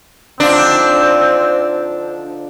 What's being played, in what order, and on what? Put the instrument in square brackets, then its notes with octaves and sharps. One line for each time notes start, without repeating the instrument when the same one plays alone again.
[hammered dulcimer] D3 F3 D#4 [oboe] C4 [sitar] D4 [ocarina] C5